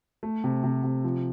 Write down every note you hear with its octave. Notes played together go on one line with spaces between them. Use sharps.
A3
C3
C3
C3
F3